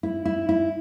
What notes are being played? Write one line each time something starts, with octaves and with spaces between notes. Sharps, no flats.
E4
E4
E4